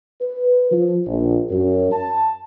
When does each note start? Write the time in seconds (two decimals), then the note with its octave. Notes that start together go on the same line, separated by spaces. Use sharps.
0.21 B4
0.70 F3
1.06 A#1
1.51 F#2
1.92 A5